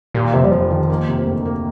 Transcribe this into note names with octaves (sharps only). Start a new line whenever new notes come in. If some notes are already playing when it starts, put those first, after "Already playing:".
D#2 A#2
F1 C3
G3
F1 F3
D#3
A#3
C3
D2
A#3